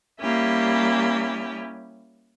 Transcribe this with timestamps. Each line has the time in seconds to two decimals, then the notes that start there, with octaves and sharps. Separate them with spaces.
0.21 G3 A#3 C#4 E4 G4